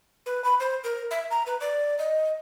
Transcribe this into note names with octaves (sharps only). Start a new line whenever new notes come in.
B4
B5
C5
A#4
E5
A#5
B4
D5
D#5